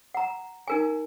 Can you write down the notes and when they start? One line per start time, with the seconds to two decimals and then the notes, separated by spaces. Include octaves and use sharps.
0.15 F#5 A#5
0.68 D#4 A#4 G#5